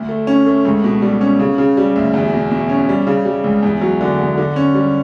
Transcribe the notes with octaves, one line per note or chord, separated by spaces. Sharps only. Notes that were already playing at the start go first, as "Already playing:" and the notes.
Already playing: D2
A3
C#4
A3
C#2
B2
G3
C#4
C#3
C#3
G3
D2
E2
B2
B2
C#4
G3
C#3
G3
C#2
E2
F#3
D3
E2
D3
C#4
G3